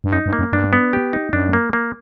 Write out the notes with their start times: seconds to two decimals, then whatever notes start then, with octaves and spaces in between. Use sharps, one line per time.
0.04 G2
0.13 F#2 D#4
0.26 G2
0.33 A#3
0.39 F#2
0.53 G2 D4
0.73 B3
0.93 G4
1.13 D#4
1.33 F#2 D4
1.53 A#3
1.73 A#3